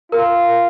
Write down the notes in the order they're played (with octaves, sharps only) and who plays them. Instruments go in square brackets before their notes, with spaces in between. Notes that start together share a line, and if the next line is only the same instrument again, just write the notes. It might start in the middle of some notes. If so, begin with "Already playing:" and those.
[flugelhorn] F4 [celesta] A#4